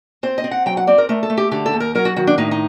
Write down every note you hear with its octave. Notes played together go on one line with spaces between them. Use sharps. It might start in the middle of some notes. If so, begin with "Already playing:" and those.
C4 C5
D#5
C4
F#5
F#3 G5
F#5
C4 D5
A#4
A3 A#4
A4
A3
G4
D3 G4
A4
D#2
A#4
F#3 A#4
F#4
D#3 F#4
D4
A2 D#4
D#4